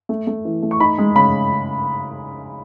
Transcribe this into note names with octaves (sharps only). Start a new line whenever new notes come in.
A3
A3
E3
A3
C#6
D#4 B5
G#3
C#3 B5